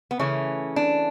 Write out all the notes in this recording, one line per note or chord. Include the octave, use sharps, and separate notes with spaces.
B3
C#3 E3 A3 C#4
D4